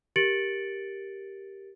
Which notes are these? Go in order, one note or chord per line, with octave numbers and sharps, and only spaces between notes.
G4 A#4 A6 C#7 D7 F#7